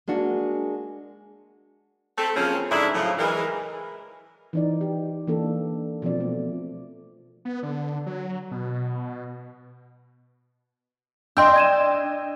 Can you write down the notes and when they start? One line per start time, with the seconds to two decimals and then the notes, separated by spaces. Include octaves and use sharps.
0.08 G#3 A#3 D4 F#4
2.18 A3 C4 A4
2.36 C#3 F3 F#3 A#3 C4 C#4
2.71 G#2 D3 D4 E4
2.94 A2 C#3 F3 F#3
3.19 E3 G#3 A#4
4.53 E3 D#4 D5
4.81 G4
5.27 E3 A#3 D4 A4
6.02 B2 F3 C4 D5
6.20 A3
7.45 B3
7.63 D3
8.06 F#3
8.51 B2
11.37 D4 D#5 G5 C6 E6 G6
11.56 G#6 D#7 E7